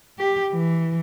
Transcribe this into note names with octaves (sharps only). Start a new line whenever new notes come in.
G4
E3